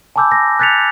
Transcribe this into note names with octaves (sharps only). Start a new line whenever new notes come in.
G#5 A5 B5 D6 E6 G6
A#6
F#6 G6 A6 B6 C#7 F7